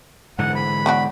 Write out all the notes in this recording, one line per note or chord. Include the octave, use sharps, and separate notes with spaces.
G#2 D3 E3 F#5
B5
B3 D4 F#4